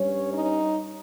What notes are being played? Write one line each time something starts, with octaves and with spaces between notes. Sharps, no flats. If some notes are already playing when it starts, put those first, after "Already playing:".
Already playing: G2 G3 C#4 C#5
D#4